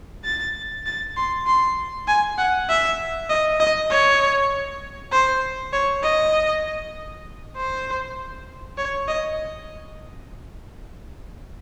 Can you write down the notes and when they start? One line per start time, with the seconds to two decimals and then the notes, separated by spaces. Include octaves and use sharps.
0.25 A6
0.86 A6
1.17 C6
1.47 C6
2.08 G#5
2.38 F#5
2.69 E5
3.30 D#5
3.60 D#5
3.91 C#5
5.13 C5
5.73 C#5
6.04 D#5
7.57 C5
8.78 C#5
9.08 D#5